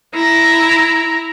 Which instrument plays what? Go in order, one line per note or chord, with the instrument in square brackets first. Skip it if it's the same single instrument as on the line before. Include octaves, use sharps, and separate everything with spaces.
[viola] E4 A#5